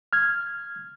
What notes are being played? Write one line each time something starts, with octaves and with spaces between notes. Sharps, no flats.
F6 G#6